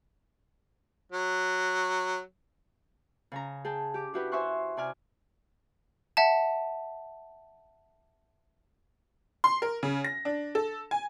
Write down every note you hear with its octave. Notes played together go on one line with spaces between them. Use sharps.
F#3
C#3 G#5 A#5
G#4 G5 A5
G4 D6
D4 E4 F#4 G4 B4
C5 E5 G#5 C6 C#6 F#6
C3 D5 G#5 F6
E5 F#5 A5
C6
A#4
C#3
A#6
D4
A4
G#5